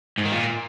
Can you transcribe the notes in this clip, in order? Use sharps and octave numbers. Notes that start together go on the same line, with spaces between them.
G#2
D#3
A#2